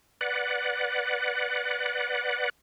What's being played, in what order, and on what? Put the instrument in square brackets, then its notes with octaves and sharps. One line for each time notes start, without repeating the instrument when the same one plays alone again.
[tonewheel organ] B4 D5 F#5